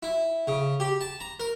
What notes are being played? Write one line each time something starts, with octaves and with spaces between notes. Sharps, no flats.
E4
C#3
G4
A5
A#5
A#4